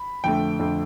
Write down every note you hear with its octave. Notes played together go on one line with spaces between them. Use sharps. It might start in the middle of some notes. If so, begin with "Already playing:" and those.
Already playing: B5
F2 D3 A3 G5
F2 D3 A3